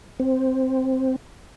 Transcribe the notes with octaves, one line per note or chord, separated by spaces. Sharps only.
C4